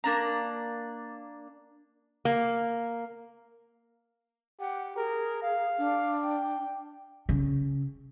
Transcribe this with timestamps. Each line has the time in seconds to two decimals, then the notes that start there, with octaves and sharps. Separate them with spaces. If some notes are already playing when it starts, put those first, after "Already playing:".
0.04 A#3 D4 A#5
2.25 A#3
4.60 G4 F#5
4.96 G#4 A#4
5.42 F5
5.78 D4
6.24 G5
7.29 C#3